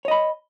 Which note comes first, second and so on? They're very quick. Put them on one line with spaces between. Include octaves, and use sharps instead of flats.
C#5 D#5 B5